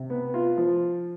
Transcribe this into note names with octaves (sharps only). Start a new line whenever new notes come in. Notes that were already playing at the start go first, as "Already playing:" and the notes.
Already playing: C3
B3
F4
F3